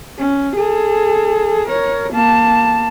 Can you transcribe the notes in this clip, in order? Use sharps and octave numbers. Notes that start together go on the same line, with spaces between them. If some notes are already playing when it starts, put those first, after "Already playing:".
C#4
G#4 A4
A#4 C#5
A#3 A5